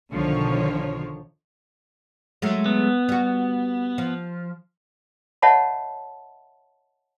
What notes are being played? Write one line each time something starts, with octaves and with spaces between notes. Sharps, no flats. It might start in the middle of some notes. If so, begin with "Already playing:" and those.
B1 D3 D#3 F3 C#5
F#3 G#3 A3
B3
G3 F#4
F3
C#5 D#5 E5 F#5 A5 B5